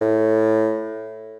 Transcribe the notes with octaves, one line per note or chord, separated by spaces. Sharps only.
A2